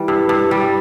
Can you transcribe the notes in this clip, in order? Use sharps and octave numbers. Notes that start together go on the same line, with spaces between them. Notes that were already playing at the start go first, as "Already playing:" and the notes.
Already playing: E3 G3
G2
G2
G3